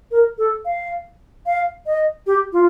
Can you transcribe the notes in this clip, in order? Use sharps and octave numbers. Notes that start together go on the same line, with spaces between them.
A#4
A4
F5
F5
D#5
G4
F4